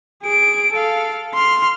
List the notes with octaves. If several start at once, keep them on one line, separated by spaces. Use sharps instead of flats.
G#4 D7
A4 F5
C6 F6